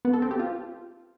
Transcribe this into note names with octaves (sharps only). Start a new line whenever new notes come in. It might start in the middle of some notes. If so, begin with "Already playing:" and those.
B3
A4
C4
G4
F4